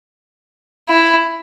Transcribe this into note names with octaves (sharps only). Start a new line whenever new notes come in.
E4